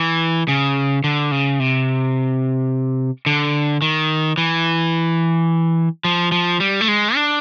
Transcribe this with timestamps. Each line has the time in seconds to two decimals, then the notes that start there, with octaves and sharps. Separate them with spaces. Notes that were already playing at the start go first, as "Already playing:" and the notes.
Already playing: E3
0.48 C#3
1.04 D3
1.32 C#3
1.60 C3
3.26 D3
3.82 D#3
4.38 E3
6.05 F3
6.32 F3
6.60 G3
6.81 A3
6.88 G#3
7.15 D4